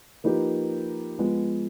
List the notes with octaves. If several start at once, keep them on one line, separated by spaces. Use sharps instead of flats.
F3 A#3 D#4 G4 B4
F3 G#3 B3